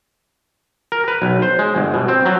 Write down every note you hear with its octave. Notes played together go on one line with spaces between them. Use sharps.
A#4
B4
B1
C5
G#3
G1
B2
C4
F#3